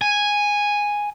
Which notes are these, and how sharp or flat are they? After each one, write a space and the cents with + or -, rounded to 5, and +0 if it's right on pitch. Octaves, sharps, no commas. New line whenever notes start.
G#5 -5